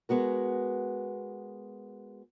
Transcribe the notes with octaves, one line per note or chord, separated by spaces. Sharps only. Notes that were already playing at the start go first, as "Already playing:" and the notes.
G#3 B3 F#4 A#4